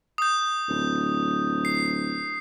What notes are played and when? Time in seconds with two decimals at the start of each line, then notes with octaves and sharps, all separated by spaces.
0.18 D#6 G6
0.68 D1
1.65 C7